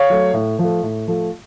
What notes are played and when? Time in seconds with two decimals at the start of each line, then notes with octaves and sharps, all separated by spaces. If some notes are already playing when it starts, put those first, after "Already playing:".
Already playing: C#5 F5
0.10 F#3 A3
0.34 A2
0.59 F3 A3
0.83 A2
1.08 F3 A3